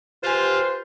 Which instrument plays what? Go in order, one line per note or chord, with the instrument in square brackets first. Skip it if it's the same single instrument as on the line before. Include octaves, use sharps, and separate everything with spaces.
[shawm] F4 [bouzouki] G4 G#5 [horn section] B4 C5